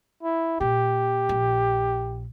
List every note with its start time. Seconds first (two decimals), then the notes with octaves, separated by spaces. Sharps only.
0.23 E4
0.61 A#2 G4
1.29 A#1